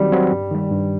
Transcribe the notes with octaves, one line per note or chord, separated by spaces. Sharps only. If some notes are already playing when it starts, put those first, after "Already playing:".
Already playing: D#3 F#3 G3 C4 F#4
F#3 C4 F#4
G2
D#3 G3
G2